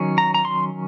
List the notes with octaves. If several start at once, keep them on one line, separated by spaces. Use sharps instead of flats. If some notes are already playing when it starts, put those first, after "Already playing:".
Already playing: D#3 F#3 C#4
A#5
A#5
C6